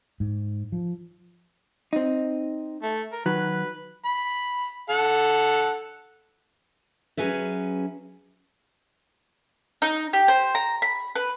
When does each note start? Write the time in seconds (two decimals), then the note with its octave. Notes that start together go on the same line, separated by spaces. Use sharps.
0.20 G#2
0.72 F3
1.93 C4 D#4
2.82 A3
3.12 A#4
3.26 D#3 F#3 B4
4.05 B5
4.90 A4 F#5
7.17 F#3 C#4 G#4 B4 E5
9.82 D#4
10.13 G4
10.28 C5
10.55 A#5
10.82 B5
11.15 B4